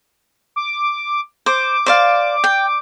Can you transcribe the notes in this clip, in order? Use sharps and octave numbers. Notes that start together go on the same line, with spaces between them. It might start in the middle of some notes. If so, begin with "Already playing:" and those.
D6
C5 D6
C5 D5 F5
G5